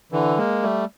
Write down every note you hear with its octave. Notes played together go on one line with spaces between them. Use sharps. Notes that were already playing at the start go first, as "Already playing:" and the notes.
D3 E3
G#3 A#3
G3 A3